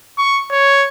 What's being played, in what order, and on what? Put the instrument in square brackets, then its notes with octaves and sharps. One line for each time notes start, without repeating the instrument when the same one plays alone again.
[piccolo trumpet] C#6
C#5